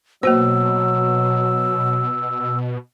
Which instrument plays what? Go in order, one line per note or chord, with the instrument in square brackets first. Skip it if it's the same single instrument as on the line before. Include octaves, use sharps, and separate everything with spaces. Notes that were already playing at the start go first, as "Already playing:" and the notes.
[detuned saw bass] B2 [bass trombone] F#3 [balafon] A#3 F#4 C5 [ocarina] E6